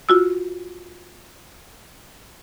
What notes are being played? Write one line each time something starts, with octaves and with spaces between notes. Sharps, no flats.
F4 F#4 E6